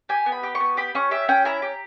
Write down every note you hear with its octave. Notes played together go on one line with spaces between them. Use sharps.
G4 G#5
B3
B5
G4
C#6
B3
G4 B5
C#4 C#6
G4 E5
C#4 G5
E4 A#5
G4